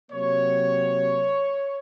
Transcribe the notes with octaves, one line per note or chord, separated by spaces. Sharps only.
C3 F#3 A#3 C#5